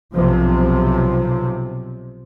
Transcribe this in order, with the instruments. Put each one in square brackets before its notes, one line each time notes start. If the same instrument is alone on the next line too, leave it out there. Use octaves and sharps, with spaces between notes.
[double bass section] B1 C3 F3